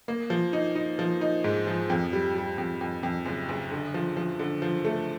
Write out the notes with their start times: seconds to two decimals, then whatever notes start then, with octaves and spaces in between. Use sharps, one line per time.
0.08 A#3
0.30 F3
0.53 D#4
0.76 D#4
0.99 F3
1.21 D#4
1.44 G#2
1.67 F3
1.90 F2
2.13 G3
2.36 G3
2.58 F2
2.81 F2
3.03 F2
3.26 F#1
3.49 F#1
3.71 D3
3.94 F3
4.17 F3
4.39 D3
4.62 F3
4.85 A3